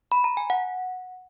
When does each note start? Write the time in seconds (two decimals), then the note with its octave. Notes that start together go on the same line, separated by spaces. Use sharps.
0.12 B5
0.24 A#5
0.37 G#5
0.50 F#5